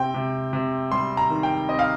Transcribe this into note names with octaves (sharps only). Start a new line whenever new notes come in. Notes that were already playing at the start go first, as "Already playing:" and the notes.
Already playing: C3 C4 G5
C3
C3
G3 C6
A#5
D#3
G5
C4 D#5
F5